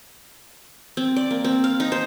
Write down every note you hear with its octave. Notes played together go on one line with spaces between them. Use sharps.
C4
D5
A#3
C4
F5
D#4
C5